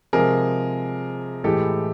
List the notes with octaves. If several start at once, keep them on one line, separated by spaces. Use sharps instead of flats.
C3 F3 G#3 G#4 A#4
A2 E3 G#3 G4 A4